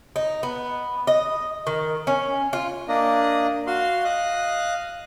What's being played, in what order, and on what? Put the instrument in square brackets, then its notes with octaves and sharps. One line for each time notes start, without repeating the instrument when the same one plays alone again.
[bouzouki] D#4
B3
D#5
D#3
C#4
F4
[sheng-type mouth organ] A#3 D4 D#5
F#4 F5 C6
D#5 F5 F#6